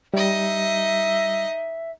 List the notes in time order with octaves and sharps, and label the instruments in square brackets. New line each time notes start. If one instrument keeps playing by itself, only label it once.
[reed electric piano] G3 [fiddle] D#4 D#5 [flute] E5